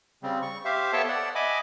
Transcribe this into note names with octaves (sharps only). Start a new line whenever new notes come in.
C#3 G3 C4
C#6
G4 C5 E5 F5
B3 A4 C#5 E5 G5 A5
D5 F#5
D#5 E5 G#5 B5 D6